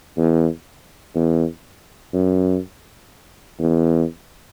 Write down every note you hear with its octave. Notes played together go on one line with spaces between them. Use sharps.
E2
E2
F#2
E2